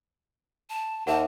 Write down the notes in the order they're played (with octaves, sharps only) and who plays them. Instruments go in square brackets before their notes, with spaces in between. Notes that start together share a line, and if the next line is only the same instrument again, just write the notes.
[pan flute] A5
[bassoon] D#2 [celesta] E5 F#5 [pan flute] A5